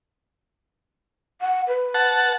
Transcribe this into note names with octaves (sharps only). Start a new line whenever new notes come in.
F#5
B4
F#5 A5